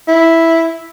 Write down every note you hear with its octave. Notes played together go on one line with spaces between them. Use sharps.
E4